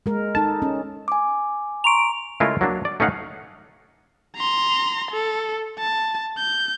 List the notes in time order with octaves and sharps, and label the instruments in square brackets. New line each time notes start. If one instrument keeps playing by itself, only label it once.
[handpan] G#3 A#4
[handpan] D#4 A4 [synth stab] A5
[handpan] C#4
[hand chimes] G#5 D6
[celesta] A#5 C6 C#6 [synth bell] D7 F7
[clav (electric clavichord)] C#3 G#3 A3 E4 F4 A#4
F#3 A#3 D4
D5
A3 C#4 D#4 F5 F#5
[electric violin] A#5 C6
A4
A5
G6